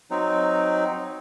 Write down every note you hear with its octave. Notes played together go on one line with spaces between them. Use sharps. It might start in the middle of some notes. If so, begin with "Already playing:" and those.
F#3 C4 D#4